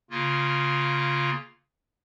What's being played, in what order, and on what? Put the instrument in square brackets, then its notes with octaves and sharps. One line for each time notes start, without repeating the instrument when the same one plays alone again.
[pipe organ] C#3 A#3 F4